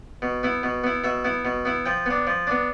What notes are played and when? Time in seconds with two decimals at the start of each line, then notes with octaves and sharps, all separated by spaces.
0.22 B2
0.43 B3 E4
0.63 B2
0.84 B3 E4
1.04 B2 E5
1.24 B3 E4
1.45 B2
1.65 B3 E4
1.85 F3 G5
2.06 B3 D4
2.27 F3
2.47 B3 D4